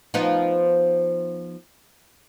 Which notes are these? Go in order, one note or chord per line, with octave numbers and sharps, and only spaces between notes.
F3 B3 D#4